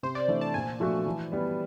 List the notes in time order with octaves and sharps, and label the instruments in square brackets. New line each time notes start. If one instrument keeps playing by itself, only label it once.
[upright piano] C3 [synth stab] C5
[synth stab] D5
[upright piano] E3 A3 D4
[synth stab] A5
[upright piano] A#2 [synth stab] G#5
[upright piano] F3 A3 D4 F#4
E3
G3 B3